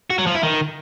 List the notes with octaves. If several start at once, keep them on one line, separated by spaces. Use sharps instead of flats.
F#4
F#3
F3
E4
D#3